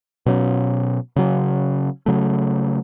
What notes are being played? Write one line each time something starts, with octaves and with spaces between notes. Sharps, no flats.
B2 F#3 C#4
C#3 F#3 C#4
C#3 F#3 A3